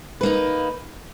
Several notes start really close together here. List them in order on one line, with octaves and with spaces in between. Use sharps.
B4 A#3 D#4